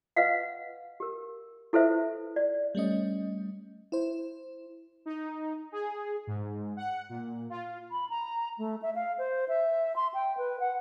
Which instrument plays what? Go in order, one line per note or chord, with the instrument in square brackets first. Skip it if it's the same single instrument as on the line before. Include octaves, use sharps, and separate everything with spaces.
[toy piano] B4 D#5 F5 F#5
G4 A#4
E4 A4 B4 C5 E5
D5
[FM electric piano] G3 A3 C#4 D#5
E4 C5
[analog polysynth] D#4
G#4
G#2
F#5
A#2
F4
[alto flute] B5
A#5
A3
E5
F5
C5
E5
C6
G5
B4
F#5